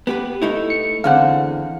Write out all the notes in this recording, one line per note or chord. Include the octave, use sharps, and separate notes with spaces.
B3 G4 B4
A3 D#4 E4
C#7
E2 D3 C4 F5 F#5